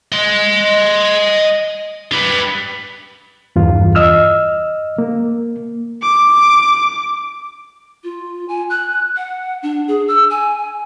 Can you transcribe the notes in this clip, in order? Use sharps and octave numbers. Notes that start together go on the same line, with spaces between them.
D#5 C6
G4 B4
E2 G2 F4
D#5 E6 F6
A#3
D6
F4
G#5
F#6
F#5
D4
G#4
E6
G#5